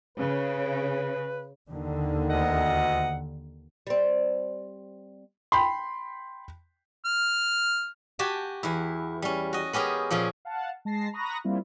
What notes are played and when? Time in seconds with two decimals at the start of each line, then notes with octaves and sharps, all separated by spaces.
0.18 C#3 B4
1.70 D#2 D3 D#3
2.30 D2 D#5 F#5
3.87 G3 C4
5.52 G5 B5 C6
7.05 F6
8.19 F#4 G4 G#5 A5
8.63 E2 E4
9.22 G3 C#4
9.53 F#4 D#5
9.73 B3 C#4 G4 G#4 A#4
10.11 A#2 F3 C#4 G#4
10.45 F5 F#5 A5
10.85 G#3 A5 A#6 C7
11.13 A#5 B5 C#6 D#6 F#6 A#6
11.44 G3 A#3 C4 E4 F4